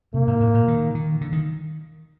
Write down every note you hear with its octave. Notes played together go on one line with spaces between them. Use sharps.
C3 A#3
G#2
A2
A#2
D#3
D#3
D3
D#3